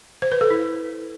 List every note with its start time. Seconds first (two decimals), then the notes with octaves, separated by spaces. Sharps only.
0.22 C5
0.32 B4
0.41 A4
0.50 E4